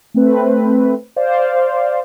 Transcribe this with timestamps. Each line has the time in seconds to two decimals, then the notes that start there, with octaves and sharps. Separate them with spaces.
0.14 A3 C4 B4
1.16 C5 D5 F5